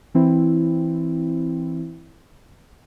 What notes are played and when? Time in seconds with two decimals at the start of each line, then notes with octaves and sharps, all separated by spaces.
0.14 E3 C4 E4